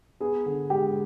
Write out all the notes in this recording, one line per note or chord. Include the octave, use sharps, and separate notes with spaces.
B3 G#4
D3
G#3 G4